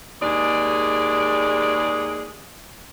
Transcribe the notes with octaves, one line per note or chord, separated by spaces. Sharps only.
D#2 G#3 G#4 D5